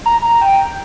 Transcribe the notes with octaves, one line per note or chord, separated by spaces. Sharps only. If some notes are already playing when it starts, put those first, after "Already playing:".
A#5
A#5
G5